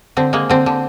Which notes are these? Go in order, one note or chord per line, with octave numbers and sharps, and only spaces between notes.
D3 C4
G#3 A#3
D3 C4
D3